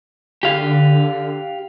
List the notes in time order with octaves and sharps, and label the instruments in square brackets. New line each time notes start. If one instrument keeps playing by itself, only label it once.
[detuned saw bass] D3 [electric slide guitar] G4 F5